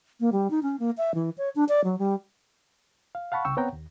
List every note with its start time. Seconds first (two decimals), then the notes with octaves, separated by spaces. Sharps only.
0.20 A#3
0.32 G3
0.51 D#4
0.63 C#4
0.80 A#3
0.98 E5
1.15 E3
1.38 C#5
1.56 D4
1.69 D5
1.84 F#3
1.99 G3
3.15 F5
3.32 F5 F#5 A5 B5 C#6
3.45 C2 C#3 G5 C#6 E6
3.57 B3 C4 C#5 F#5 G5 A#5
3.73 D#2